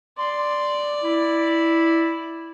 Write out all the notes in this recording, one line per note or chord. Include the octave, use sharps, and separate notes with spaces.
D5 C6
E4